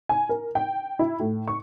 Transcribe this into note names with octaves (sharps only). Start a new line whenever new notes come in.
G#5
A#4
G5
E4
A2
C#6